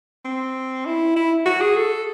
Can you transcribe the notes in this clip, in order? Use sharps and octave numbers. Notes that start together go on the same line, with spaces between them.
C4
E4
E4
F#4
G#4
A4